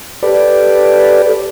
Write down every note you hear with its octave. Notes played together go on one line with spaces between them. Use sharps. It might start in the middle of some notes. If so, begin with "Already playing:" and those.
G4 A4 B4 D5